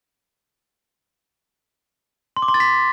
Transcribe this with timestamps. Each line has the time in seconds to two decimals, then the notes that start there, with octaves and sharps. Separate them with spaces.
2.37 C6
2.42 D6
2.48 C6
2.54 A6
2.60 B6